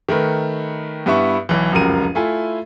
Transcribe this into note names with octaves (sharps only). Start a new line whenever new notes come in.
D#3 A3 A#4 B4
G2 B3 E4 E5 C#6
B1 E3
F1 C#2 F#2 A#4 D#7
A3 E4 F4 G#5